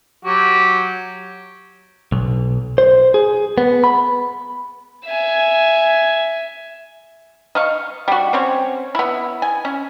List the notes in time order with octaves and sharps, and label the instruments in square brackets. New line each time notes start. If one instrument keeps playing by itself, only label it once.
[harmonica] F#3 F#4 G4
[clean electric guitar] B1
C5
G#4
B3
B5
[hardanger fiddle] E5 G#5
[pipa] D#5 F5 C#6
G3 F#4
C4 C#4 C#5
B3 E4
G#5
C#4